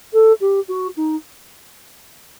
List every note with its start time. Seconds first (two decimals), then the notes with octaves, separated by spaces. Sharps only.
0.13 A4
0.40 G4
0.68 F#4
0.96 D#4